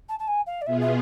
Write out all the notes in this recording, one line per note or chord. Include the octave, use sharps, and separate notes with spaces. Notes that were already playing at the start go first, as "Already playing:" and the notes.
A5
A5
G#5
F5
D5
B2 B3 F4 G#4 E5
E5